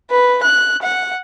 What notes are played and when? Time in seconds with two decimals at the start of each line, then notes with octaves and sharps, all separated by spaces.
0.10 B4
0.43 F#6
0.82 F#5